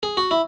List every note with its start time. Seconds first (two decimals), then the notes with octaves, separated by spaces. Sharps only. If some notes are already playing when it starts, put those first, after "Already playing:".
0.03 G#4
0.17 F#4
0.31 E4